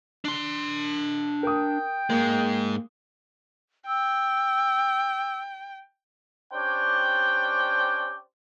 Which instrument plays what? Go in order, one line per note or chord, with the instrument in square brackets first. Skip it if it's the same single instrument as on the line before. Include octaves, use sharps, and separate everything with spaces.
[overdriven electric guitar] D4 C6
[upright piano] A#4 D#6 [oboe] G5
[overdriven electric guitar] G#2 G#3 [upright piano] A#3
[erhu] G5 [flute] E6
[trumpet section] C#4 D4 G4 C5 D5 G5